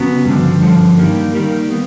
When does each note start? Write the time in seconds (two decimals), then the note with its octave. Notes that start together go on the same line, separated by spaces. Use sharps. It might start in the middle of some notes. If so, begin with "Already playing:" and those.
Already playing: C#3 F#3 B3
0.25 G2 D3 F3
0.61 G2 D3 F3
0.98 D#3 G3 A#3
1.34 D#3 G3 A#3
1.70 B3